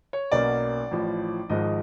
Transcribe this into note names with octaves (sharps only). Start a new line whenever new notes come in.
C#5
B1 B2 F#3 A#3 C#4 D5
A1 A2 F3
G#1 G#2 F3 G#3 D#5